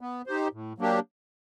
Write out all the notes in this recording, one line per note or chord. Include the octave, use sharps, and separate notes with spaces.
B3
D#4 G4 C5
A2
F#3 A#3 D4 G4